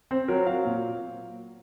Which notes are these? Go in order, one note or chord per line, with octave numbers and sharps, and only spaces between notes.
C4 C5
F#3 A#4
F#3 F5
A#2